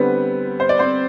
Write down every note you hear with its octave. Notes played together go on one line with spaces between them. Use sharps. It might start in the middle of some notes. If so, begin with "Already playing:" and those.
Already playing: D3 G3 B3 C4 B4
C5
D5
C4 C5